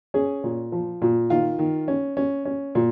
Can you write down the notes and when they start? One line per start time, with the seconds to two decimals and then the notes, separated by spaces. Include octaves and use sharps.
0.14 C#4 G#4
0.44 A#2
0.72 F3
1.02 A#2
1.30 D#3 F4
1.59 D#3
1.88 C#4
2.17 C#4
2.45 C#4
2.75 A#2